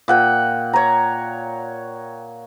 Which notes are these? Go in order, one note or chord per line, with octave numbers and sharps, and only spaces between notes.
A#2 F#5 G5
C#5 A#5